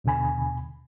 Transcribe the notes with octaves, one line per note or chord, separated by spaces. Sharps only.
D#2 B2 D3 G#5 B5